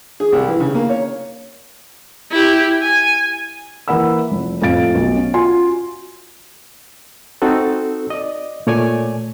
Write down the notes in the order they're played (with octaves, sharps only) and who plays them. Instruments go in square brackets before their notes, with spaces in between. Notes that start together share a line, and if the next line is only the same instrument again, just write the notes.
[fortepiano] G#4
C2
E3
C#3
A#3
C#5
[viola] E4 G4
G#5
[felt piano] E3 A#3 F#5 B5 E6
F1
F2 A2 F5 A6 D7
B1
C#4
F4 F#4 G#5 C6
[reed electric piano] C4 D#4 F#4 A4
D5 D#5
A#2 A3 C#5 D5 G#5